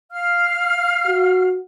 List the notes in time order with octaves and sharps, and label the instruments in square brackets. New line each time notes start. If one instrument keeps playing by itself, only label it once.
[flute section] F5 F6
[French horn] F#4